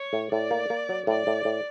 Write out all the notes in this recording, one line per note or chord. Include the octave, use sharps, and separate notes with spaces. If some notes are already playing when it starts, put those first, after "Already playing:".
Already playing: C#5
A2
A2 D5
A#3
A#3
F#3
A2 D5
A2
A2